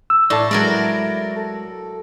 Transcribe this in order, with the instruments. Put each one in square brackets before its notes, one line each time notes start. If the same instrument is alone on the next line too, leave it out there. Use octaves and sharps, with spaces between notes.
[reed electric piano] E6
[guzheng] A2 [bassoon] E4 [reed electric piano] D5 A5
[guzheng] F#3 A#4 D5 [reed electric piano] G#3
[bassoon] A4